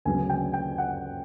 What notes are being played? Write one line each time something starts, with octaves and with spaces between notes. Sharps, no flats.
D2 C#3 F#3 B3 G#5
G5
G5
F#5